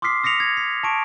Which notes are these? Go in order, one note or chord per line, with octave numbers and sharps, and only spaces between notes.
C6 D6 D#6 F6 B6 C7
D#6 A#6 B6 C#7 F7
G#6
B6
A5 C#6 D7